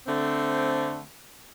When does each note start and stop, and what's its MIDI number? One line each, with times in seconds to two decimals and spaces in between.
0.07 1.02 50
0.07 1.02 57
0.07 1.02 60